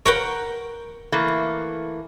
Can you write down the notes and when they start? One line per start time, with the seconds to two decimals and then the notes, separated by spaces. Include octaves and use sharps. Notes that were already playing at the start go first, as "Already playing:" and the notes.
0.06 A#4 B4 C#5 F#5 G5
1.12 E3 A3 A#3